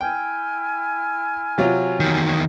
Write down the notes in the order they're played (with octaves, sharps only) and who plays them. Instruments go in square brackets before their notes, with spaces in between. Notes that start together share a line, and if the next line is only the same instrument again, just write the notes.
[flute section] E4 G#5 F6 [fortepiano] G5
[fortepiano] C3 F#3 F4
[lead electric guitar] E2 D#3
[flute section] C#6 D#6